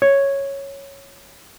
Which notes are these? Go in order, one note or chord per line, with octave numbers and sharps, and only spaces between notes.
C#5